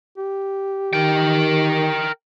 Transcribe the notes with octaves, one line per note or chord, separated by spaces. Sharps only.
G4
D#3 A#4 G5